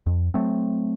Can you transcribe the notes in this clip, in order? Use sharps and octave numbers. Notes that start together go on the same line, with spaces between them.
F2
F#3 A3 C4